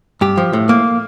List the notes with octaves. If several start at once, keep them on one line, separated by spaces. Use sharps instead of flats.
G2 G4
F3
A2
A#3